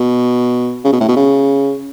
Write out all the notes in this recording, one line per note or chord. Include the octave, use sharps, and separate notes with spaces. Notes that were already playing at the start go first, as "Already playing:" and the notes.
Already playing: B2
C#3
B2
A2
B2
C#3